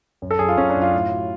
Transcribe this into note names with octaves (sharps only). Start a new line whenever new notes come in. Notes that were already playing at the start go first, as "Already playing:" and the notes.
F#2
A4
F#2 G#4
F4
F#2 C#4
D4
F#2
F4
A2
F#3